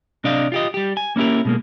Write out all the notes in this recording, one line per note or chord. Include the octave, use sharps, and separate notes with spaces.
C3 D4 D5 D#5 F5
F4 G4 D#5
G3 G4
G#5
A#3 C#4 E4 G4 A#4
B2 G#3 A#3